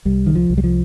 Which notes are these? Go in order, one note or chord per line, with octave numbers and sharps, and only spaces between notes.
C2 G3
D#3
F3
C2
G3
F3